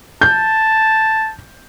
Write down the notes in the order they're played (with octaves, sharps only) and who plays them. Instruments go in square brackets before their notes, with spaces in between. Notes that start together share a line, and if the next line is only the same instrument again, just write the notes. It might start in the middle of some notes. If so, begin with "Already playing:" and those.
[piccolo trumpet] A5 [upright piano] G6